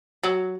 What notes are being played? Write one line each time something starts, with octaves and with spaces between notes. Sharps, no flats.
F#3